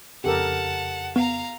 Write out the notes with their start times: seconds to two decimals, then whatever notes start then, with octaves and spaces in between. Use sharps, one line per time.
0.24 F2 C#3 G4 A4 A#4 F#5 A5
1.16 B3 F5 A#5